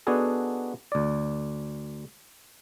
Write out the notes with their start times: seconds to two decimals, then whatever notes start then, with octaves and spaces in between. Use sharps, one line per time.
0.07 B3 D4 D#4 F#4 G#4 A4
0.92 D2 D5